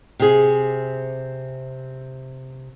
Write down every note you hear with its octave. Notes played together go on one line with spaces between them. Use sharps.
C3 G#4